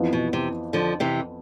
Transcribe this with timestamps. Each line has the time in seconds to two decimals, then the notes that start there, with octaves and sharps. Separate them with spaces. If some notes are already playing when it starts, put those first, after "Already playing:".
Already playing: F2 E3 B3 F4
0.13 B2
0.33 C3
0.73 D3 F3
1.00 C3 E3